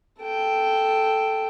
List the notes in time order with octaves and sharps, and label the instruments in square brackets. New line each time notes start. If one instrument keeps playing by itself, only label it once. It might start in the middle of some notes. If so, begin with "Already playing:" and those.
[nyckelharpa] A4 G5